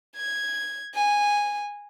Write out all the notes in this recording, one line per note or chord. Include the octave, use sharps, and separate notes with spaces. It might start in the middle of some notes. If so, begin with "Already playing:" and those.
G#6
G#5